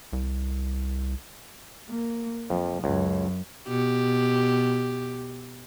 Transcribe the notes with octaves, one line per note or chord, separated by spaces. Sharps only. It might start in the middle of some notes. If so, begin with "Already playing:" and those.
C2
A#3
F2 F3
C#2 F#2
B2 G4